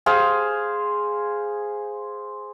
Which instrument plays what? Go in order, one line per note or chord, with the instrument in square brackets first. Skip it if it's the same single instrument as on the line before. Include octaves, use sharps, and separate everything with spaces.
[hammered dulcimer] G#4 C5 F5